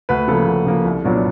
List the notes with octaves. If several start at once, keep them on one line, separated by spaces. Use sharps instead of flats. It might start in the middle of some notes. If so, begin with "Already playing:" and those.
D2 B4
C#3 F3 A#3 A4
D2
C#3 F3 A#3
C2
A#2 F#3 B3 D4